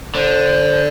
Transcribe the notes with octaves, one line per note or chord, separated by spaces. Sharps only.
D3 C5